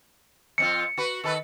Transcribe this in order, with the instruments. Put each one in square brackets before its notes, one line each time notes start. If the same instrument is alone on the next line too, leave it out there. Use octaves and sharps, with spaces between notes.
[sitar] F2 C4 F4 [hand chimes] C#7
[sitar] F#4 B4
D#3 A4 B4